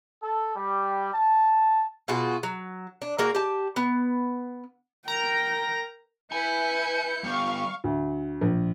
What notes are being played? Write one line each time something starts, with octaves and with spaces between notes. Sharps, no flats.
A4
G3
A5
B2 F4 F#4 G#4
F#3
D4
G#3 A#3 F#4
G4 A5
B3
A#4 G5 A#5
E4 B4 G#5 G6 C#7
G3 B3 F5 C#6
D2
A#1